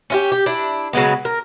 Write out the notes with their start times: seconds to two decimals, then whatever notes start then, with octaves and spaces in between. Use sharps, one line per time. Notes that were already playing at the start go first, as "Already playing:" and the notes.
0.10 C#4 F4 G4
0.32 G4
0.46 D4 E4
0.93 C#3 F#3 G#3 B3
1.25 A#4